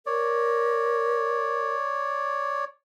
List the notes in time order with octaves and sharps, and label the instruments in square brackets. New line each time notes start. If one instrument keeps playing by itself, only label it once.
[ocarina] A#4 [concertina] C#5 D5